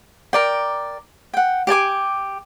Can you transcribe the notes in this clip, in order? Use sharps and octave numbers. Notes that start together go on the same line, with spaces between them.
A#4 D5 G5
F#5 G5
G4 D5 G#5 D6